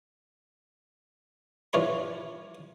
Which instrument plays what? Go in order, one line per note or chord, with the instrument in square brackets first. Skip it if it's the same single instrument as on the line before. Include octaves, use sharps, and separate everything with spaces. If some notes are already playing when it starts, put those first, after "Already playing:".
[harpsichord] G2 E3 F4 C#5 B5